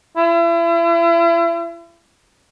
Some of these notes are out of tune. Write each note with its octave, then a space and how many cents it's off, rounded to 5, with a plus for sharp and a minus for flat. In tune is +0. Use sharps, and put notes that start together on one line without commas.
E4 +35